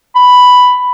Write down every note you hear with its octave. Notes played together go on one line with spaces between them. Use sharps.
B5